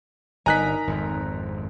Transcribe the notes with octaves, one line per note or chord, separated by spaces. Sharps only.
G1 D#4 A#4 G#5 A#5 F#6 B6
G#1 F2